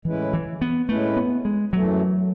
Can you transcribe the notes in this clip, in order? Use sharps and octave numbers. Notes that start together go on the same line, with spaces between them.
A2 E3 G#3 C#4 E4 B4
E3
B3
A2 G#3 A3 C#4 E4 B4
B3
G#3
F#2 E3 F#3 A3